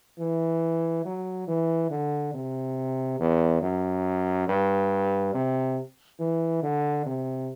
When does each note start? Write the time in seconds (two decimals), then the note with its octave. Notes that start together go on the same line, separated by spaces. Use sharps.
0.19 E3
1.05 F#3
1.48 E3
1.91 D3
2.34 C3
3.20 E2
3.62 F#2
4.48 G2
5.34 C3
6.19 E3
6.62 D3
7.06 C3